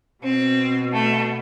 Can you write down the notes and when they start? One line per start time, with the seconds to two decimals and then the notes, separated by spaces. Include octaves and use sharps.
0.23 B2 C4
0.93 A3